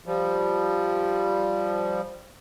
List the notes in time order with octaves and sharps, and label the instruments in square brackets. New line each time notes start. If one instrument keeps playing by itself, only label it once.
[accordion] F3 G3